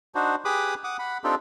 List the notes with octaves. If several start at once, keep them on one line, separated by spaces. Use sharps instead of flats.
D4 D#4 F#4 C5
G4 G#4 B4 B5 D6 D#6
F#5 D6 D#6
F#5 B5
C4 D4 D#4 F4 G4 A4